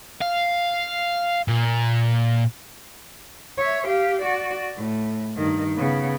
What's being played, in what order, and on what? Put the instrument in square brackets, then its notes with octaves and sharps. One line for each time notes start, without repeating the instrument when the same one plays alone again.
[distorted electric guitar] F5
A#2
[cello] C#5 E5
G4 F5
F#4 D5
A2
G2 D#3
C#3 B3